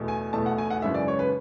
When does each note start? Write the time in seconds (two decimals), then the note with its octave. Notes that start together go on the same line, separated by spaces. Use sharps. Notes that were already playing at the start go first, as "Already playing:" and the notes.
Already playing: E2 B2 A3
0.08 G#5
0.33 E2 B2 A3 A5
0.46 F#5
0.58 G#5
0.70 F#5
0.82 G#1 F#2 C#3 E3 E5
0.94 D5
1.08 C#5
1.19 B4